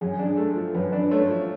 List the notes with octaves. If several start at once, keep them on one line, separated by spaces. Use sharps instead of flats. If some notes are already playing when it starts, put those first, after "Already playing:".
F#2 G#4
D4
A3 A4
F3
F#2 B4
D4
A3 C#5
F3